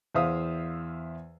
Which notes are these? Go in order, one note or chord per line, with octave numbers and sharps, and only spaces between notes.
E2 C5 E5 F5 D#6